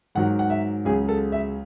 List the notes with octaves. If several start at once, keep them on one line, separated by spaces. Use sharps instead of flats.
G#2 D#3 F#3 F#5
F#5
E5
C#2 C#3 F#3 G#4
A4
E5